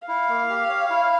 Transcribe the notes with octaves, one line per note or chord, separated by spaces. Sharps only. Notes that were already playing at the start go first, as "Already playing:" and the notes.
E4 F5
A#3
G4
C#5
E4